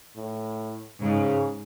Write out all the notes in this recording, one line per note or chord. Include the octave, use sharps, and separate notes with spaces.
A2
G#2 C#3